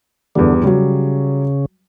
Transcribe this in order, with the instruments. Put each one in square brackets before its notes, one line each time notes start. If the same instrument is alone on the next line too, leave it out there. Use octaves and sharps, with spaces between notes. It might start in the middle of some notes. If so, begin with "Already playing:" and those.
[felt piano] E2 G2 G3 [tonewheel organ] D3
[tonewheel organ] C#3 [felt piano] F#3 G3